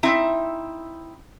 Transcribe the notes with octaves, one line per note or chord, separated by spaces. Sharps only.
C4 D#4 E4 E5